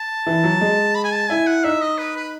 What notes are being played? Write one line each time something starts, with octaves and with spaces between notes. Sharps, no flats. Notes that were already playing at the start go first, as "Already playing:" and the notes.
Already playing: A5
E3
F#3
G#3
B5
G#5
A5
E4 G#5
F#5
D#4 E5
D#5
B4
B4